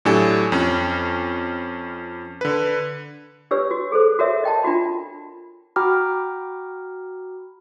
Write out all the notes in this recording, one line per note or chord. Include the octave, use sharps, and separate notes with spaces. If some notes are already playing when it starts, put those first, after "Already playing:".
A2 F#3 D4 G4 A4 G#5
F2 C#4
D3 B4
D4 G4 B4 C#5 E6
F#4
G#4 A4 C5
F#4 A#4 C#5 E5
D#5 G5 A5
D4 F4 F#4 B5
F#4 G5 A#5 B5 D6 F6